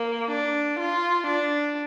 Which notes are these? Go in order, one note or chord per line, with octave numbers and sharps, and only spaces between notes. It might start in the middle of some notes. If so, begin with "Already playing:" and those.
Already playing: A#3
D4
F4
D4